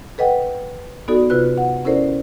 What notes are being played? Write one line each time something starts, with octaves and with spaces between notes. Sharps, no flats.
A4 B4 D#5 F#5 G5
B3 D#4 F#4 A4 D5
C3 F4 B4 F#6
F#5
C#4 E4 A4 A#4 C5 D5